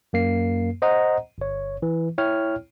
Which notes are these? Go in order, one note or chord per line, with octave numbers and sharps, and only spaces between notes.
F#2 A#3 C7
C5 D#5 F#5 A#5
G1 C#5
E3
E4 C#5 G5 F6